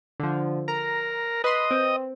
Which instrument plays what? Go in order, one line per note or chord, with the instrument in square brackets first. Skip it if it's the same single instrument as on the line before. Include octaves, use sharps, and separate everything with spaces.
[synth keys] D3 F3
[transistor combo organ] A#4 [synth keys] A#5
[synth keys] B4 C6 [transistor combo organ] D#5
[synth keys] C4